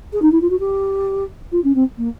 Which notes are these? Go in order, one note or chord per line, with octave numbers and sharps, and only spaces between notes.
G#4
D#4
E4
F4
F#4
G4
F4
C#4
C4
A#3